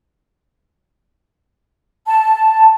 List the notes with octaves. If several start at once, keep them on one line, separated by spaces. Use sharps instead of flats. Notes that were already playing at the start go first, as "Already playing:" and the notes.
A5